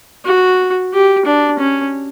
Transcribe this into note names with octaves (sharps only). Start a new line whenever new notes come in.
F#4
G4
D4
C#4